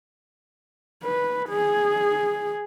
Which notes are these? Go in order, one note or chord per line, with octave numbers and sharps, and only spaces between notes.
B4
G#4